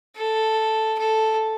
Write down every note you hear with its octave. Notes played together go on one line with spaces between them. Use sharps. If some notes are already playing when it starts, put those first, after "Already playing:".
A4
A4